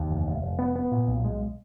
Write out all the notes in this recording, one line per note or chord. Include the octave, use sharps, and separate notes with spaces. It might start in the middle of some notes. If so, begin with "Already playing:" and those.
Already playing: D#2
F1
F1
F1
B3
B3
A#2
B1
G#3